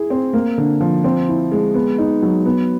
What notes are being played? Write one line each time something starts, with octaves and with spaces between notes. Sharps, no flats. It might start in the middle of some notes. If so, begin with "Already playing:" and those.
Already playing: E4 G#4
C4
A#3
D3
F3
C4
E4
G#3
B3
D#4
F#3
B3